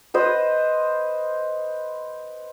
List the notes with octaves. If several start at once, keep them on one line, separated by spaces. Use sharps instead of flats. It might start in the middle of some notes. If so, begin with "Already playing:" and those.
B4 C5 D#5